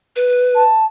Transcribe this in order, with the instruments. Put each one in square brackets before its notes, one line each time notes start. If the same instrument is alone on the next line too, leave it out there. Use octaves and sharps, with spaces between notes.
[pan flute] B4
[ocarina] A5